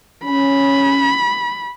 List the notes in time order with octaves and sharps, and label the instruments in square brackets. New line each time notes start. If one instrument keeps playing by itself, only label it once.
[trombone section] C#4 [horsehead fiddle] B5